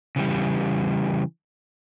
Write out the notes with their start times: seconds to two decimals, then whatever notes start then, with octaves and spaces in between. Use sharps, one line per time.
0.16 C#3 E3 G3